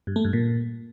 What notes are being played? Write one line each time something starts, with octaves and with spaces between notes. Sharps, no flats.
G2
A3
G2
A#2